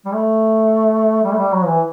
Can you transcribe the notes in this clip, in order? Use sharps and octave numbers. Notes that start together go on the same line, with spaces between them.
G3
A3
G3
A3
G3
F#3
E3